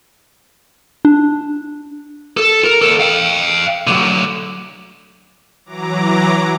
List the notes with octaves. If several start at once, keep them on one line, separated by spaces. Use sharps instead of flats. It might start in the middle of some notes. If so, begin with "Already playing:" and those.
D4
A4
A#4
D#2 A4
F5 G5
D3 F#3
E3 F#3 A#5 D6